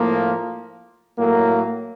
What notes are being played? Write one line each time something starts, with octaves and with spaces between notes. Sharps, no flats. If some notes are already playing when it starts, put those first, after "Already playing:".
Already playing: A2 F3 A#3
A2 F#3 A#3